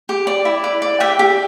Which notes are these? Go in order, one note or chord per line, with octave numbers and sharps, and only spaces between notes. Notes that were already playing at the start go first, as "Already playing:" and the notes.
G4
D5
E4
D5
D5
G4 E5 G5
G4